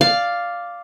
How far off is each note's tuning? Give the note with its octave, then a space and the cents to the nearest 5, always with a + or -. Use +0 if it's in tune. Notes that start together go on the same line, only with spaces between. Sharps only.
D5 +0 F5 +0